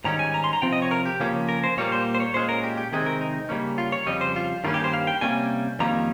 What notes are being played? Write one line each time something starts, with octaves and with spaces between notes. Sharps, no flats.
G#2 D#3 G3 C#4 A#5
G#5
A#5
C6
A#5
C3 F3 C4 G5
D#5
C#5
A#4
G4
C#3 F3 A#3 C#4
A#4
C5
A#2 G3 A#3 C#5
C5
C5
C#5
A#2 G#3 C#4 C5
A#4
G4
G4
C3 D#3 G#3 C4 G#4
A#4
D#4
C#3 G3 A#3 C#4
F4
C#5
F2 C#3 G3 D#5
C5
F4
G2 D#3 G3 A#3 C#4 F4
G4
C5
F5
G5
C3 G3 A#3 C#4 G#5
F2 D#3 G3 A#3 C#4 A#5